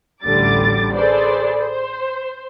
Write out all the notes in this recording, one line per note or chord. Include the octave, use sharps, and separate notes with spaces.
A1 D2 D3 G3 D6 A6
G#4 A4 B4 C5 D5
C5